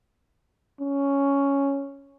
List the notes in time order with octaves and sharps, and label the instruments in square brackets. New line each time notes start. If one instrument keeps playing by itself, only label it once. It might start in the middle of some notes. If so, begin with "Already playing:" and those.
[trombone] C#4